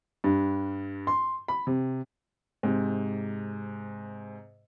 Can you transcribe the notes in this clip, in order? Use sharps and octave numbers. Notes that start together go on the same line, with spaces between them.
G2
C6
B5
C3
G#2 C3